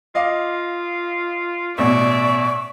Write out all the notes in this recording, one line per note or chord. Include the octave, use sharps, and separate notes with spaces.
F4 D#5 F5 D6
A1 B2 D5 E5 C#6